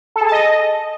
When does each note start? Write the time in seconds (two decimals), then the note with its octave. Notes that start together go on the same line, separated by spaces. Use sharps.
0.16 A4
0.21 G#4
0.26 A5
0.32 D#5